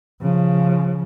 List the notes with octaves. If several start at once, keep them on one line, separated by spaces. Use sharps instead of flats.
C#3 F3